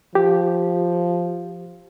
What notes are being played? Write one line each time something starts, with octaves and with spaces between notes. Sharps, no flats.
F3 G4